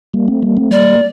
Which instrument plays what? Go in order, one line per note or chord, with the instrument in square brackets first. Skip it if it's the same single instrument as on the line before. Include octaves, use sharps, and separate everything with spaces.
[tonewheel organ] G3 A#3
A3 C4
G3 A#3
A3 C4
[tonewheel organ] G3 A#3 [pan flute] D5